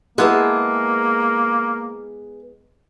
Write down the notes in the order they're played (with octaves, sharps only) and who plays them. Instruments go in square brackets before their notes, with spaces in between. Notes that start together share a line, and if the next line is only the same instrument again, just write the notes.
[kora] G#3 B3 E4 [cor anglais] A#3 [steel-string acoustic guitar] G#4 B4 A5